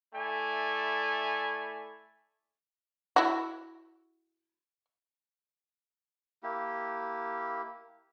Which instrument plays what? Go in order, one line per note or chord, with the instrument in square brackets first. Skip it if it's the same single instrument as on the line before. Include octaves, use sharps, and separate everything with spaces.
[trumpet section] A3 E4 D5 G#5
[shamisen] E4 F#4
[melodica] A#3 E4 G4